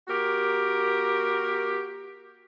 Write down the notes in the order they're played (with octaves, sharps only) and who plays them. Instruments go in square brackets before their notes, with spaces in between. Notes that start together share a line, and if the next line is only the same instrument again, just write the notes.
[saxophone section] A#3 F#4 G4 A#4